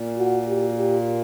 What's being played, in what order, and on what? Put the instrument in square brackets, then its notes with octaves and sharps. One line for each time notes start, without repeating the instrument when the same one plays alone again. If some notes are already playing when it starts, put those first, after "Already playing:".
Already playing: [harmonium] A#2
[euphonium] F#4
G4
G4